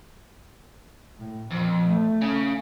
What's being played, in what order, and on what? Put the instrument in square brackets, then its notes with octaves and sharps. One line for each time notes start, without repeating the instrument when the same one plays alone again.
[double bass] A2
[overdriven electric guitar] F2 [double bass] A#2
[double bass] A3
[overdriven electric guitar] C#3